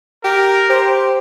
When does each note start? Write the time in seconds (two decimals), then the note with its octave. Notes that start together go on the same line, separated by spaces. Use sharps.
0.24 G4 A#4
0.69 G4 C5